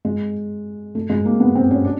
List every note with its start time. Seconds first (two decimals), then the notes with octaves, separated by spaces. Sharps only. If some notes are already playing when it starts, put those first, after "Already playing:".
0.05 G#3
0.95 A3
1.10 G#3
1.25 A#3
1.40 B3
1.55 C4
1.71 C#4
1.85 D4